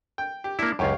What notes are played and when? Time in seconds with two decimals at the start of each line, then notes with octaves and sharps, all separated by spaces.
0.18 G5
0.44 G4
0.59 A#3 D4 E4
0.79 C#2 F#2 G4 C#5 F5